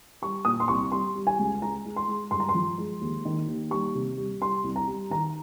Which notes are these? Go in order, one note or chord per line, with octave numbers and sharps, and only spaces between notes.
G3 C#6
A#2 D#6
C6
C2 C#6
G3 C6
G3
G#5
C#2
G#3 A#5
G#3
C6
G#3
G2 C6
A#5
C6
F3
G#3
D#2
D#3
D#2
G3 C#6
C3
G3
G3 C6
C2
A#5
G3
D#3 A#5